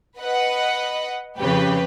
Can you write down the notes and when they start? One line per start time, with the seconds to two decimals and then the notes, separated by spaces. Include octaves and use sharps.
0.19 B4 D#5 F#5
1.39 F2 C#3 G4 B4